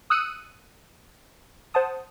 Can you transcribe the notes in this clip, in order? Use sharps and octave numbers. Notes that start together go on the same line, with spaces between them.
D#6 E6 F#6 C#7 D#7
C5 F#5 A5 D#6